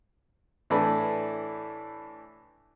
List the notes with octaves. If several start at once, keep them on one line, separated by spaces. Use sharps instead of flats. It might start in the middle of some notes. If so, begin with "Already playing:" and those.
A2 E3 A3 D4 B5